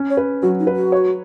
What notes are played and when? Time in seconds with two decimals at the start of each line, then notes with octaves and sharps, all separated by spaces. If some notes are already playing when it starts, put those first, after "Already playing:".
Already playing: C#4
0.10 C#5
0.17 B4
0.42 F#3 F#4
0.59 D#4
0.67 B4
0.76 F#4
0.92 C#5